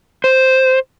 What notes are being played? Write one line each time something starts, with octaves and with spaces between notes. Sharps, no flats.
C5